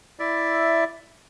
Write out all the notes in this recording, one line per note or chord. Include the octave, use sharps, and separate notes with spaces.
E4 D5 E5